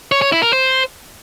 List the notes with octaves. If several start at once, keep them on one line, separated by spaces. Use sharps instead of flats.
C#5
C#5
E4
A#4
C5